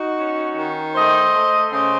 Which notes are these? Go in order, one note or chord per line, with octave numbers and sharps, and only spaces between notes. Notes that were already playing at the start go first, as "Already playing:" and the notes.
Already playing: D#4 F#4
C#4
D#3
A3 C5 D#5
A3
C#3 C5 D#5